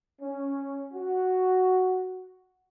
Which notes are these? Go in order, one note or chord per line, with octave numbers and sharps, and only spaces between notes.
C#4
F#4